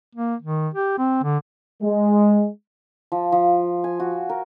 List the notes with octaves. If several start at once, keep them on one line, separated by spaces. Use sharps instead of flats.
A#3
D#3
G4
C4
D3
G#3
F3
F3
G#5
F#4
A#4